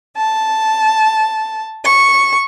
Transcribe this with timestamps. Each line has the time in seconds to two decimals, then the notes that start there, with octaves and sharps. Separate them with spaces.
0.16 A5
1.84 C#6